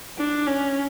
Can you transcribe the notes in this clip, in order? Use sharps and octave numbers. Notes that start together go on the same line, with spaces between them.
D4
C#4